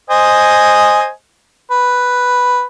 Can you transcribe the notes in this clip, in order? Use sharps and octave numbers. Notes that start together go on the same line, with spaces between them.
C5 D#5 G#5
B4